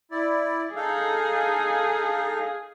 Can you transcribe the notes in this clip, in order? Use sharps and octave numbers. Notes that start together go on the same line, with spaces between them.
E4 D5
D#4 G#4 A4 F5